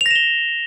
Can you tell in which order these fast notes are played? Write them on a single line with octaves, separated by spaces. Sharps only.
F7 A#6 E7 G7